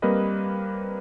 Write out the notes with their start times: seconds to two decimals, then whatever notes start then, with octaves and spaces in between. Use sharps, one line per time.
0.02 G3 A#3 C4 A#4 B4 D#5